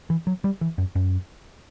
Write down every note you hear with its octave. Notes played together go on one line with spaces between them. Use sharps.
E3
F#3
G3
E3
F#2
F#2